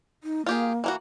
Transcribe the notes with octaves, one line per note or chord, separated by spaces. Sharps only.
D#4
A#3 F4 G4 G#4
E3 A#3 F#4